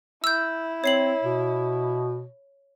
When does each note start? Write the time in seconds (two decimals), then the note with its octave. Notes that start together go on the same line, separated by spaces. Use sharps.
0.24 E4 E6 G6
0.84 C4 C#5 C7 F#7
1.23 B2